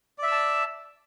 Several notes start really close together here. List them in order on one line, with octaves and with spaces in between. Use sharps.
D5 E5 E6 A5